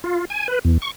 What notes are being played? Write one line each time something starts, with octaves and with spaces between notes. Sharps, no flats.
F4
G#5
B4
E2
C#6